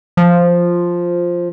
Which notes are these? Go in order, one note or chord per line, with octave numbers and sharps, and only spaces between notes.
F3